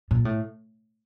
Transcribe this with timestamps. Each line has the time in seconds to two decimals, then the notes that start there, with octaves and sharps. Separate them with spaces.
0.11 A#2
0.25 A2